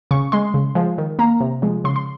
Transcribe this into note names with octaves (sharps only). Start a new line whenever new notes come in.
C#3 C#6
G#3 C6
C#3
F3 G#3
D#3
A#3 A#5
C3
F3 G#3
C#3 C6
C6